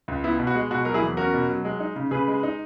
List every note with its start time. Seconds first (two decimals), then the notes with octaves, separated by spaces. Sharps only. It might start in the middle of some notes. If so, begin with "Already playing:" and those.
0.08 C#2
0.24 B3 E4
0.39 B2
0.47 F#4
0.55 G#3
0.71 B2 F#4
0.85 F#3 A#4
0.94 E4 G#4
1.02 E2
1.17 C#4 F#4 A#4
1.34 B2
1.49 F#3
1.65 G#3
1.80 D#4
1.96 C#3
2.11 C#3 G#4 B4
2.28 G#3
2.43 D#4